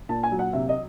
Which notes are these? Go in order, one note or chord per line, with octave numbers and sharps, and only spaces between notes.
A#2 A5
G#5
F#3
F#5
C3 E5
D#5